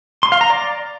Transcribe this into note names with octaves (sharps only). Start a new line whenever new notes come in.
C6
F5
A#5
D5